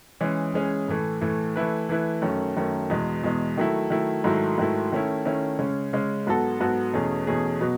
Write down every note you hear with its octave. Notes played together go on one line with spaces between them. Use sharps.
E3 G#3 C#4 G#4
E3 G#3 C#4 G#4
A2 E3 A3
A2 E3 A3
E3 A3 E4 B4
E3 A3 E4 B4
F#2 D#3 A3 C#4
F#2 D#3 A3 C#4
E2 B2 G#3
E2 B2 G#3
D#3 F#3 A3 E4
D#3 F#3 A3 E4
G#2 D#3 F#3 A3 E4
G#2 D#3 F#3 A3 E4
D#3 A3 C#4 E4
D#3 A3 C#4 E4
C#3 G#3 C#4
C#3 G#3 C#4
G#2 F#3 B3 F#4 A4
G#2 F#3 B3 F#4 A4
E2 B2 A3 C#4 G#4
E2 B2 A3 C#4 G#4
B2 F#3 B3